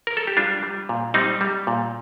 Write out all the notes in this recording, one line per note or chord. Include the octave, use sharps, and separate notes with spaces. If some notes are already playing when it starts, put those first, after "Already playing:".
A#4
A4
G4
G3 D4 F4
G3
A#2
G3 C4 D#4
G3
A#2